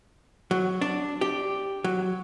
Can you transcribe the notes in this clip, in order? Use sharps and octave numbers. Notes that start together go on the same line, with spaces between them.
F#3
D4
G4
F#3